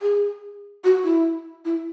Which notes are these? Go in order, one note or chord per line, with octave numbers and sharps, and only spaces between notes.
G#4
F#4
E4
E4